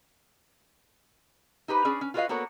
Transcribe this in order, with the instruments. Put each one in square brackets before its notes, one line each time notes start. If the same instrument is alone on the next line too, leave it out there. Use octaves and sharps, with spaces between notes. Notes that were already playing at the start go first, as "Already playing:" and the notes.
[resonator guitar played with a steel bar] D#4 G4 B4 C5
C#4 D4 G#4
C#4
F4 F#4 G#4 B4 D#5 F5
A#3 B3 F#4 A4 A#4 C#5